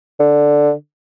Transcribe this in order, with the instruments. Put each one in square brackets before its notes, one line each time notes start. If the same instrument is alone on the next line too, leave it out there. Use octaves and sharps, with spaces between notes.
[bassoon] D3